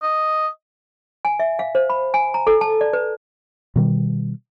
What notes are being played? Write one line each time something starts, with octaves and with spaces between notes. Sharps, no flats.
D#5
G#5
E5
F5
C5
B5
G#5
A#5
A4
A5
D5
B4
B2 D#3 G3